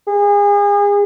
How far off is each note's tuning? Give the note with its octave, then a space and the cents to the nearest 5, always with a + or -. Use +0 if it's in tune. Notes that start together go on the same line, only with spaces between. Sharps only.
G#4 -35